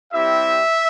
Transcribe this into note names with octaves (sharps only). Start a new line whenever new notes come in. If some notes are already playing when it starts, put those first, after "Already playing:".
G3 C4 E4 G4 E5